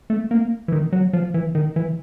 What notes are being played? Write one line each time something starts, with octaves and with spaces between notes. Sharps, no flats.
A3
A#3
E3
D#3
F#3
F3
E3
D#3
E3